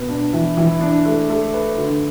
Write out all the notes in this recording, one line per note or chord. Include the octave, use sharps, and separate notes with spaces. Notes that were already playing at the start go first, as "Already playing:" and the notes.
Already playing: B2 B4
D4
E3
E3
D4
A3
A3
B4
D3